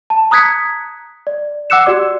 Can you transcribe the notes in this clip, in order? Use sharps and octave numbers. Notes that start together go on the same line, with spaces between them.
A5
A#5 D#6 F#6 G#6 B6 C#7
D5
F#5 D6 E6 F#6 C#7 E7
F#4 G4 D5 D6